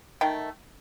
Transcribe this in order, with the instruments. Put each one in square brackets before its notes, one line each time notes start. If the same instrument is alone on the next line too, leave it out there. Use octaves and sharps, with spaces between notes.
[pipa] D#3 A3 G5